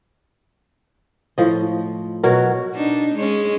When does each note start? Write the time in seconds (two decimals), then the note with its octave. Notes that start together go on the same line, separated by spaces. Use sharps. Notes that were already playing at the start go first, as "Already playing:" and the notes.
1.38 A2 F3 D#5
2.24 B2 F#3 F#4 A#4
2.75 D4 D#4
3.15 G#3 C#4